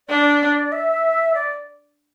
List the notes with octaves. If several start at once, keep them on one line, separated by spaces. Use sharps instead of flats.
D4 D5
E5
D5